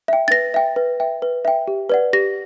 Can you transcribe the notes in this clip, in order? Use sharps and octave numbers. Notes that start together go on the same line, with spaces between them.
E5 G5
A6
B4 A#6
E5 G5
B4
E5 G5
B4
E5 G5
G4
B4 D5 F#5
G4 A#6